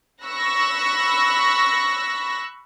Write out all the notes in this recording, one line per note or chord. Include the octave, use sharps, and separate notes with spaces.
B5 C#6 E6 F#6 A#6